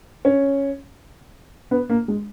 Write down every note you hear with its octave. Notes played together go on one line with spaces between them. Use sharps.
C#4
B3
A#3
G#3